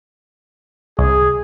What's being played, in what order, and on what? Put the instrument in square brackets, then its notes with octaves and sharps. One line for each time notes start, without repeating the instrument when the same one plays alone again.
[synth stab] C2 [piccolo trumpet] G#4